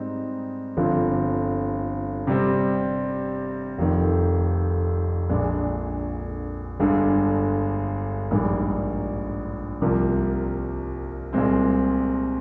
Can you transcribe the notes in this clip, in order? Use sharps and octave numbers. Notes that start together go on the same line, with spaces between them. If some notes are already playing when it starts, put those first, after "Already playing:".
Already playing: G#2 G3 C4 D#4
G1 G2 D3 F3 C4
C3 G3 C4
F1 F2 D#3
A#1 A#2 G#3 D4
G1 G2 D3 G#3
A#1 G#2 G3 A#3
C2 C3 F3 A#3
C2 A#2 G#3 C4